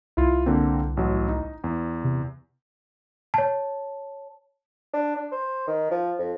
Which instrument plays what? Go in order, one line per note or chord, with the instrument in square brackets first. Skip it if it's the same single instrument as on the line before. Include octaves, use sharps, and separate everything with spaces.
[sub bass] C2 [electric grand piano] E4 F4
[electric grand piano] D3 A#3 C4
A1 F#3
D#4
E2
[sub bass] C3
[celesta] C#5 A5
[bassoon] D4
D4
C5
D#3
F3
F2